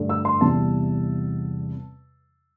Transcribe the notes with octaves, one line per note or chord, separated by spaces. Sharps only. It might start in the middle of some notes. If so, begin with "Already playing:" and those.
Already playing: G2 D3 A3 D4
E6
C6
E2 C3 E3 G3 A5